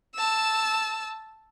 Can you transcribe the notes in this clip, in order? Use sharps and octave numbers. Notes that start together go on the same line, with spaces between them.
A5 E6